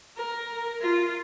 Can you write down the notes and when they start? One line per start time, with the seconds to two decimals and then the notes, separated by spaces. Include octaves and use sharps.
0.17 A#4
0.81 F4